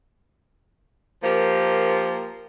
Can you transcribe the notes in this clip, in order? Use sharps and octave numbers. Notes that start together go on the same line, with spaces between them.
F3 A#3 G4 A#4 C5